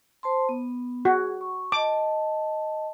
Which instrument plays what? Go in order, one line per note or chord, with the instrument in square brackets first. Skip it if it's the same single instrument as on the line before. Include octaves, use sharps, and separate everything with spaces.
[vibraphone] C5 A5 C6
B3
[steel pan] F#4 [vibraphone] G#4
[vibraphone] C#6
[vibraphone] D#5 A5 [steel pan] D6